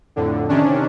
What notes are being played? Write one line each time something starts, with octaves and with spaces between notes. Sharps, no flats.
F2 A2 D3
C3 D#3 C#4 D4